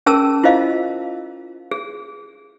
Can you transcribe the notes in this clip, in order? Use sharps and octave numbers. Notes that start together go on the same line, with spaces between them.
C#4 G#4 A#4 A5 E6
E4 F4 C5 D#5 F5
G#4